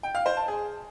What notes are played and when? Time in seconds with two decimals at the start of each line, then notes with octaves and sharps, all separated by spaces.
0.03 G5
0.15 F5
0.26 C5
0.37 A5
0.48 G#4